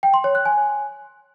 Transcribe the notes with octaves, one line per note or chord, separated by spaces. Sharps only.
G5
C6
C#5
F#6
G#5